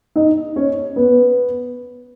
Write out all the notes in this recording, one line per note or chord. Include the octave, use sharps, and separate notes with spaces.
D#4 D#5
C#4 C#5
B3 B4